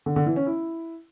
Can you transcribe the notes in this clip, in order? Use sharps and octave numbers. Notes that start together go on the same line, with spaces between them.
D3
D3
E3
C#4
E4